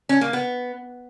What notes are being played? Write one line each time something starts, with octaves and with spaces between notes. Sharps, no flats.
C#4
A#3
B3